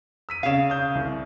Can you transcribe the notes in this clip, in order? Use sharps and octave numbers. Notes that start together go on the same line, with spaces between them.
E6 B6 D#7
C#3 G#4 F5 E7
D#6 G6
C2